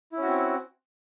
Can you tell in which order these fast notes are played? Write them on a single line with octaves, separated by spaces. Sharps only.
E4 C#4 F#4 C4